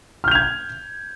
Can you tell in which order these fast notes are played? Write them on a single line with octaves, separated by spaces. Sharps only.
F6 G6 F7 G#6